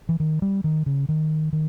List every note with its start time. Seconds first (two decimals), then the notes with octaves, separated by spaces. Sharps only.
0.09 E3
0.20 D#3
0.42 G3
0.64 D#3
0.86 C#3
1.09 D#3
1.53 D#3